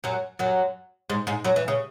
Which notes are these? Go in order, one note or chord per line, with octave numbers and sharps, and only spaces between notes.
F#2 F#3
F#2 F#3
G#2 G#3
G#2 G#3
F#2 F#3
E3
C#3